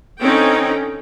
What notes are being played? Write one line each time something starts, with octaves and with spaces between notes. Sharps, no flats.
D3 C4 C#4 D#4 G5